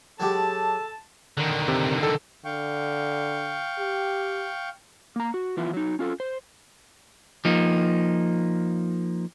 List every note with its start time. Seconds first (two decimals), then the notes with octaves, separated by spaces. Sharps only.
0.20 F#3 G#3 G4 A4 A5
1.37 D3 D#3
1.68 C3
2.03 A4
2.45 D3 F5 G5 C#6
3.79 G4
5.16 A#3 A#5
5.34 F#4
5.57 E3 F3 B3 E4 F4
5.73 F#3 D#4
5.99 C#4 F4 G#4 A4
6.20 C5
7.45 F3 A#3 D#4